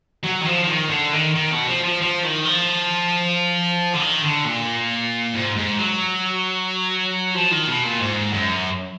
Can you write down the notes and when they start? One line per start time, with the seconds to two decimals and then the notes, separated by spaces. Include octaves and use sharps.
0.23 F#3
0.41 D#3
0.45 F3
0.64 F3
0.67 D#3
0.89 D3
1.13 D#3
1.35 D#3
1.51 B2
1.67 F3
1.84 F3
2.01 F3
2.23 D#3
2.45 F3
3.94 D3
4.01 D#3
4.23 D3
4.45 A#2
5.34 G#2
5.56 G#2
5.79 F#3
7.35 F3
7.52 D#3
7.68 B2
7.84 A#2
8.00 G#2
8.34 F#2